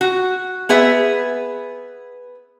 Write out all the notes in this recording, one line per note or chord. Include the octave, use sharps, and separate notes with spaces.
F#4
B3 G#4 B4 E5